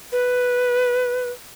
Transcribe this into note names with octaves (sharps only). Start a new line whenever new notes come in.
B4